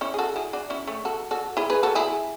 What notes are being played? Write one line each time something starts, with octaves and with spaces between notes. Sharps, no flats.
C#4 E4
G#4
F#4 A4
E4 G#4
D4 F#4
C#4 E4
A3 C#4
F#4 A4
F#4 A4
E4 G#4
G#4 B4
F#4 A4
E4 G#4